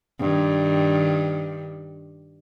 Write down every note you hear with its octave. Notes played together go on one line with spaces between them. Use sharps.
G2 D#3